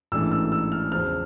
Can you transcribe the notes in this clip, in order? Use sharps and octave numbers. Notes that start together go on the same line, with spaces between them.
A1 G#2 E3 A3 D4 E6
E6
E6
F6
E2 C#3 F3 F6